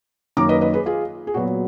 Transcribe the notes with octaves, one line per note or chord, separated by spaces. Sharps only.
F#2 D#3 A#3 A#5 D6
B4 D#5
B4 D#5
G#4 B4
F4 G#4
G#4
A#2 F#3 B3 F#4